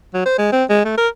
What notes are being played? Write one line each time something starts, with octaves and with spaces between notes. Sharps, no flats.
F#3
C5
G#3
C4
G#3
A3
A#4